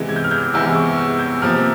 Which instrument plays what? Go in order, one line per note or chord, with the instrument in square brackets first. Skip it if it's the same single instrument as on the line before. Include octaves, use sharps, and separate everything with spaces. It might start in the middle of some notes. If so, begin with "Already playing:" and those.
Already playing: [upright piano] E2 C3 E3 G#3
G#6
G6
F6
G6
E2 C3 E3 G#3 E6
C#6
E6
G6
C3 F3 A#3 F6